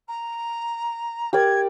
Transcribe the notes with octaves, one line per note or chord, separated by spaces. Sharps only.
A#5
G4 A#4 D5 G#6